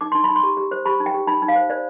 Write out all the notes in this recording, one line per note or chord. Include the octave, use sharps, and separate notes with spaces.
D#4 D6
D#4 C6
B5
D#4
C6
G4
G4
C5
G4 B5
D#4
G5
G4
D#4 B5
D#4
F5
C5
C5 D5